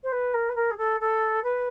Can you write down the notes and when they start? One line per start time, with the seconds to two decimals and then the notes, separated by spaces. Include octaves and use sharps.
0.03 C5
0.12 B4
0.33 A#4
0.48 B4
0.55 A#4
0.70 G#4
0.77 A4
1.00 A4
1.43 B4